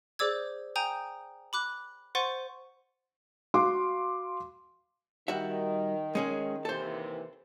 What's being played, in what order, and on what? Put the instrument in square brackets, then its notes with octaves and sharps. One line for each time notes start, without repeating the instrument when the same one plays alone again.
[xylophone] G#4 C5 D5 D6 E6 G#6
G5 G#5 A#5 D#6 G6
B5 D6 F#6
C5 F#5 C6 C#6 A6 D#7
[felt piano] F#4 F5 C6 D6
[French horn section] D#3 [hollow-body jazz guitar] G3 F#4 E5
[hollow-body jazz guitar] G#3 C#4 G#4
[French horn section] D#2 C3 E3 [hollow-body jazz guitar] A4 C5